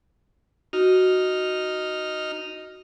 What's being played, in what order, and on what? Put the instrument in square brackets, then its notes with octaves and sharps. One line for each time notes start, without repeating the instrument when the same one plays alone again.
[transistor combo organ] D#4 F6 [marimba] F#4